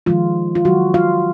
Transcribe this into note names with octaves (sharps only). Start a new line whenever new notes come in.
D#3 F3 G#3 F4
F4
D#3 F#3 G#3 F#4
F4 F5